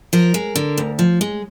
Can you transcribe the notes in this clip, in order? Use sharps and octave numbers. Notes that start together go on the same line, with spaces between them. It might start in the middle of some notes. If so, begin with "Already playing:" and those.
F3 A#4
G#3
D3
D2
F3
G#3